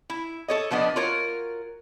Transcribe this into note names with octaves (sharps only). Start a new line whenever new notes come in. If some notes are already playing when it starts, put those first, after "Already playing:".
E4
A4 C#5 D#5
B2 F3 B3 D4 D#5
F4 F#4 A#4 C#5